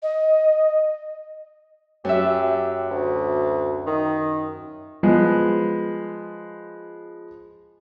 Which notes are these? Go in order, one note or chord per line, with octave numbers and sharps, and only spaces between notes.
D#5
F#2 G4 E5
D2
D#3
F3 G#3 B3